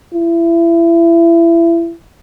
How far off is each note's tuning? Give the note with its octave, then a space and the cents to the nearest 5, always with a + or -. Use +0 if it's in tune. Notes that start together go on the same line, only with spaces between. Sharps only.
E4 +30